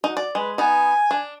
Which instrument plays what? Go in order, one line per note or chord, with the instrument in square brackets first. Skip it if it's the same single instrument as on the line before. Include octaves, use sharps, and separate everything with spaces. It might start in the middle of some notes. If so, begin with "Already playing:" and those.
[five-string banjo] D#4 [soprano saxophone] F#4
[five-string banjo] D5
[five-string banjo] G#3 [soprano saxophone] B4
[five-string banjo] B3 D#4 [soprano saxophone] G#5
[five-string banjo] D4